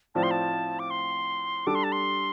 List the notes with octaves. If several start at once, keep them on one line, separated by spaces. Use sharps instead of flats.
A2 F3 C4 F4 D5 A5
C6
A5
D6
C6
G3 D4 A4 D6
C6
A5
C6